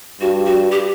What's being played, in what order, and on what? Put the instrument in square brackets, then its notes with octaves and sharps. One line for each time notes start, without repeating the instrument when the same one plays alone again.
[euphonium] G2 [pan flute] F#4
[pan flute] F#4
G4